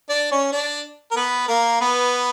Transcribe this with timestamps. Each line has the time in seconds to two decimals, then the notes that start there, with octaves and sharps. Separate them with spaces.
0.09 D4 D5
0.31 C#4 C#5
0.52 D4 D5
1.11 A#4
1.16 B3 B4
1.48 A#3 A#4
1.81 B3 B4